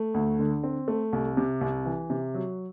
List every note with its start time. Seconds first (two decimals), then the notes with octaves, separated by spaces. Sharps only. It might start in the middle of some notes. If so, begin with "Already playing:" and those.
Already playing: A3
0.14 D2
0.39 D3
0.64 C4
0.88 A3
1.13 C2
1.37 C3
1.61 C2
1.85 E3
2.10 C3
2.34 F#3